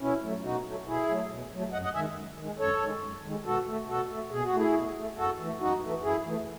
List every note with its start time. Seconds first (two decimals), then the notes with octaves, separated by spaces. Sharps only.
0.01 B2 C#4 E4
0.22 F#3 A3
0.44 B2 D#4 F#4
0.66 F#3 A3
0.87 B2 E4 G#4
1.08 F#3 A3
1.31 B2
1.52 F#3 A3
1.73 F#2 D#5 F#5
1.84 D#5 F#5
1.95 D#3 G#3 E5 G#5
2.16 F#2
2.37 D#3 G#3
2.59 F#2 A4 C#5
2.80 D#3 G#3
3.03 F#2
3.23 D#3 G#3
3.45 B2 F#4 A4
3.67 A3
3.88 B2 F#4 A4
4.10 A3
4.31 B2 G#4
4.43 F#4
4.53 A3 E4 G#4
4.74 B2
4.96 A3
5.17 F#2 F#4 A4
5.39 E3 A3
5.60 F#2 D#4 F#4
5.82 E3 A3
6.03 F#2 E4 G#4
6.24 E3 A3